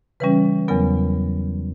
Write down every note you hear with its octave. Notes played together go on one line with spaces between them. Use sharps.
C#3 E3 G3 C#4 B4
E2 C#3 F#3 B3 A#4